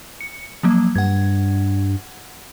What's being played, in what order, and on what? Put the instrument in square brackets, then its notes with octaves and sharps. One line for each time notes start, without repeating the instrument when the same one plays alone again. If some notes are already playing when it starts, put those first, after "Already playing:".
[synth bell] C#7
F3 F#3 A#3
[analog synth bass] G2 [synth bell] F#5 G#6